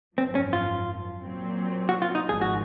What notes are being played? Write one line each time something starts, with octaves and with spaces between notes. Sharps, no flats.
G#1 F#2 F3 C4
C#4
F4
A#2 F#3 C4
F#4
F4
D#4
G#1 G#2 F3 G#4
F#4